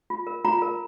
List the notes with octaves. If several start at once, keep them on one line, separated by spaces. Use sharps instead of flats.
F4
A#4
F4 A#5
A#4